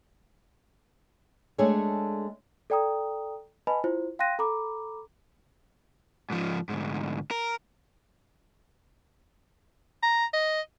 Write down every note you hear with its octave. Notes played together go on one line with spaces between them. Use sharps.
G#3 A3 D4 G#4 A4 C#5
A4 D5 G5 A#5 D#6
B4 D#5 G#5 A5 B5
E4 F4 C5
F5 G5 C6 F#6 A#6 D#7
A4 A#5 B5 D6
G#2 F3
D2 G#2
A#4
A#5
D#5